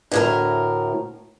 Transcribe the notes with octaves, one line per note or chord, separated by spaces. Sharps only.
D2 A2 A#4